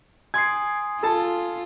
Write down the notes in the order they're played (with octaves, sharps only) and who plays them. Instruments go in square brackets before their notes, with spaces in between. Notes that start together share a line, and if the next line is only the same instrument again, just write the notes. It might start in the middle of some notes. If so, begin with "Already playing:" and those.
[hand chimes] G#5 C6 D#6 [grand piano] G#6 C7
[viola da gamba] F4 [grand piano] A4 A5